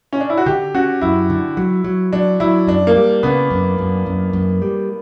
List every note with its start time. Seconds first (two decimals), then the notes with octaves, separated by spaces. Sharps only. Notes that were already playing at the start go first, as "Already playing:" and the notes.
0.13 C#4
0.20 D4
0.30 E4
0.37 F#4
0.46 D3 G4
0.74 C#4 F#4
1.01 F#2 E4
1.30 D3
1.57 F#3
1.84 F#3
2.13 F#3 D4
2.40 F#3 E4
2.67 F#2 D4
2.87 A#3
2.95 G3
3.23 C#3 B3
3.51 F#2
3.78 F#2
4.06 F#2
4.33 F#2
4.62 G3